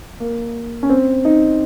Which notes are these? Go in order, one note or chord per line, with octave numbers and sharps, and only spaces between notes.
A#3
C#4
C4
D#4